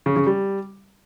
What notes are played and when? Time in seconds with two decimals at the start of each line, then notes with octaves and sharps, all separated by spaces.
0.06 C#3
0.16 C#3
0.27 G3